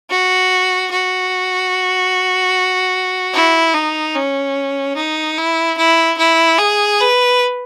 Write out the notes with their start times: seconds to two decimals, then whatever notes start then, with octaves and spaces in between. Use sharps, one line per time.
0.10 F#4
0.91 F#4
3.34 E4
3.74 D#4
4.15 C#4
4.96 D#4
5.38 E4
5.78 E4
6.18 E4
6.59 G#4
7.00 B4